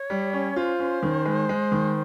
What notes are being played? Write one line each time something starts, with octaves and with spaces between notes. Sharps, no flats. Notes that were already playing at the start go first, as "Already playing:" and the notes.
Already playing: C#5
G3
C#4
F4 C5
C#4
D#3
G#3
G#3
D#3